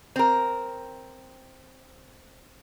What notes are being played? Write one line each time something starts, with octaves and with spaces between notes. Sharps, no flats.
C4 A#4